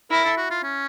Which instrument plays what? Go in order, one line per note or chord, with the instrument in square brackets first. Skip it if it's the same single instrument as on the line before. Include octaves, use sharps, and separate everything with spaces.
[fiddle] E4 [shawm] A#4
[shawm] A4
F#4
F4
C#4